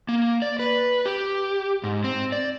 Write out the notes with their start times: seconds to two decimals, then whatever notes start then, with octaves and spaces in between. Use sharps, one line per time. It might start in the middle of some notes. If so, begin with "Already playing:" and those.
0.09 A#3
0.42 D5
0.59 B4
1.06 G4
1.84 G#2
2.04 C4
2.32 D5